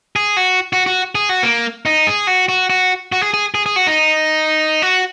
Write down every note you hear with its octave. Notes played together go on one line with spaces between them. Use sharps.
G#4
F#4
F#4
F#4
G#4
F#4
A#3
D#4
G#4
F#4
F#4
F#4
F#4
G#4
G#4
G#4
G#4
F#4
D#4
F#4